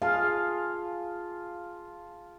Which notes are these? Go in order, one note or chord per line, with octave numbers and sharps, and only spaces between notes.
F4 G#4 F5 A5